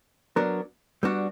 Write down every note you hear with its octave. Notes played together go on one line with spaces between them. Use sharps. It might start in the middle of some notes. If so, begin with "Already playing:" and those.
F#3 B3 D4 A#4
G3 B3 D4 F#4